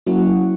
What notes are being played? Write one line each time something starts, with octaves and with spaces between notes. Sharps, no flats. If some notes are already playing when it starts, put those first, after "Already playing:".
F#3 A#3 C#4 E4 F#4